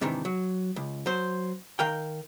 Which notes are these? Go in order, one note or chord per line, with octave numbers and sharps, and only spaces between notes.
G#2 C3 D#3 E3 D4
F#3
C#2
F#3 C5
D#3 A#4 F5 G5